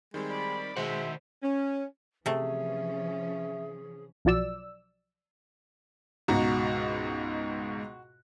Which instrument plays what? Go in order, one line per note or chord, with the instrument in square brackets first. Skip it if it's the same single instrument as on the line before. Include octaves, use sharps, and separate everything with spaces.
[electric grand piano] D#3 G3 C4 [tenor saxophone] G#3
[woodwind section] D5 B5
[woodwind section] B2 E5 [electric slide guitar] D#3 F#4 F#5 [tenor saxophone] G#3 [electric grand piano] C5
[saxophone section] C#4
[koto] C3 A3 [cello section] E3 F3 C#4 [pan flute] G#4 [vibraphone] E5
[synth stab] B1 F3 F#3 D5 E6
[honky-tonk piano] C#2 G#2 B2 [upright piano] F#4 A#5